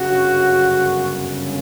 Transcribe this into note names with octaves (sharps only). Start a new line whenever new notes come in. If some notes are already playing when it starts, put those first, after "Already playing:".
Already playing: G1 F#2 C#3 F#4